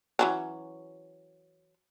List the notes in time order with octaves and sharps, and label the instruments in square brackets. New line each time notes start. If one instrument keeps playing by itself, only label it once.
[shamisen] E3 F#3 C#4